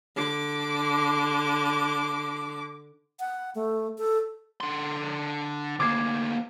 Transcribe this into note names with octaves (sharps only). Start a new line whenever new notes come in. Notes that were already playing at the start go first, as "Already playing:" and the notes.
D3 D6
F#5
A3
A4
D3 C6
D2 A#3 D6 G#6 C7